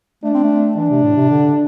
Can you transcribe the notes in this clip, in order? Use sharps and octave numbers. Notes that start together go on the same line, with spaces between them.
A3 D4
C4
A3
E3 D4
C3
A2
C3
D3